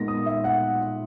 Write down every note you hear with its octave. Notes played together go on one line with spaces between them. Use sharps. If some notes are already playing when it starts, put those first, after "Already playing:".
Already playing: A#2 G#3 B3 D#4 A#6
D#6
E5
F#5